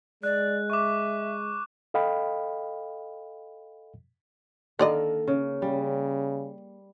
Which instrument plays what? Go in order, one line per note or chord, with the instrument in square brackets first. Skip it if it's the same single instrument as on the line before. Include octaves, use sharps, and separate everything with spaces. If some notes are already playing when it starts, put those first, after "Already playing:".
[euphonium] G#3 [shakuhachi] D5 [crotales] F#6
[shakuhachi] E5 [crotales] C#6 D6
[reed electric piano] A4 D#5 F5 G5 B5
[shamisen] D3 D5 D#5 [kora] D#3 A#3 [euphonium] A4
[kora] C#3
[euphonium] C#3 [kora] G3